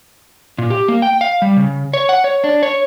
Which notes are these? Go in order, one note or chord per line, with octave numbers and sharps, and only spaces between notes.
A#2
G4
A#3
G5
F5
G3
C#3
C#5
F#5
C#5
D4
C#5